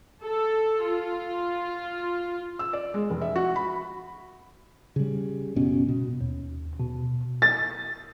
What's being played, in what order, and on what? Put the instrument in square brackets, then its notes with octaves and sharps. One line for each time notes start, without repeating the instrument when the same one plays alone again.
[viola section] A4
F4
[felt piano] E6
D5
G#3
F1
E5
F#4
B5
[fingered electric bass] C#3 G3
F#1 B2 C#4
B2
[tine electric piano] D#2
B2
[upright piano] A6